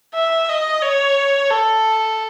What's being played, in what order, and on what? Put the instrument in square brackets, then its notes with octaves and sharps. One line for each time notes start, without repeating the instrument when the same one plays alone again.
[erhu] E5
D#5
C#5
A4